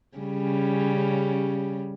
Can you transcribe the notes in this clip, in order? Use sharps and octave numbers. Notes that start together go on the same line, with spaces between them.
C#3 G3 C#4